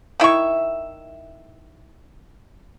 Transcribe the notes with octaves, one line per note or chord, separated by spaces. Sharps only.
D#3 E4 E5 C#6